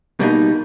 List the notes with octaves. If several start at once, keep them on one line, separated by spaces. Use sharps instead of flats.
B2 G3 A#3 D#4